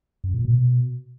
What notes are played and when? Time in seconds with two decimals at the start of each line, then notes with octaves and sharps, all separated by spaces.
0.24 F#2
0.34 A#2
0.45 B2